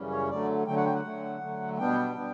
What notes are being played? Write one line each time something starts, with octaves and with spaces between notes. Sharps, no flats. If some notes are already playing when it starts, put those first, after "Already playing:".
Already playing: F#2 C#3 E3 G3 C#4
C#5
D3 F#3 A3 D5
D3 F#3 A3 G5
F#5
G5
F#5
D3 F#3 A3
D3 F#3 A3
B2 G3 B3 D4 G5
G3 B3 D4